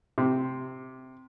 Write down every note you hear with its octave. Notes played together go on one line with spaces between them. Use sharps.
C3